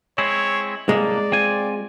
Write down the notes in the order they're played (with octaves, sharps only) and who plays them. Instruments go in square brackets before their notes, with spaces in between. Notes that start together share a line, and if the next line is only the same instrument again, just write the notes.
[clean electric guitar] G#3 C4 E4 [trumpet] C#5
[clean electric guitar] C2 A2 A#3 [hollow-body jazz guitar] G#3 [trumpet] D5
[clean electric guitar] C4 F4 G#5